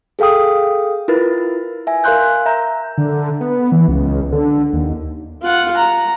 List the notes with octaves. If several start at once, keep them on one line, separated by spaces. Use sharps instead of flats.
G#4 A4 F5 G5 D#6
E4 F4 A#4 B4 A6
E5 G#5
A#4 F5 G#5 C6 F#6 G6
E5 A#5 G6
D3
B3
E3
C#2
D3
D#2
F4 F#5
A#5